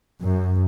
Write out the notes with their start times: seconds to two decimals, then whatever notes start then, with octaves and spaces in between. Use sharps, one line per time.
0.21 F#2